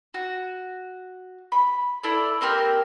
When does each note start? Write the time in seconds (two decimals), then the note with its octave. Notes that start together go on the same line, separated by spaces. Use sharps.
0.14 F#4
1.52 B5
2.03 E4 A4 D5
2.41 A#3 C4 G4 A#4